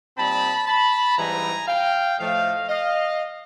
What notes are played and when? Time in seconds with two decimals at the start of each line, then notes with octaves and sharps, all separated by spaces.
0.17 A#2 G3 C4 D#4 A5 B5
0.67 A5 B5
1.17 G#2 E3 G3 C4 D#4 G#5 A#5
1.68 F5 G5
2.18 A2 F3 A3 D#5 F5
2.69 D#5 F5